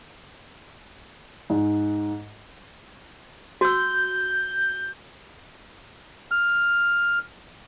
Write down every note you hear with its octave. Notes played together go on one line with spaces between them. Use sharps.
G#2
F#4 E6 G6
F6